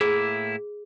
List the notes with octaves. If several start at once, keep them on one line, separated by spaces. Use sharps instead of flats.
A2 A#3 E4 G#4